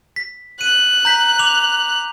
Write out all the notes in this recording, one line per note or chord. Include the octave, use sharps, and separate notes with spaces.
B6
F#6 D#7
A#5 G6 B6
D6 F7 F#7